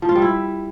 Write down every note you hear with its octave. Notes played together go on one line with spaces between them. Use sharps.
F3
F4
G3
E4